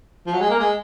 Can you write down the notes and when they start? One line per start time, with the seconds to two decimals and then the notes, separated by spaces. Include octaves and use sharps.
0.26 F3
0.34 F#3
0.41 G#3
0.50 A#3
0.60 G#3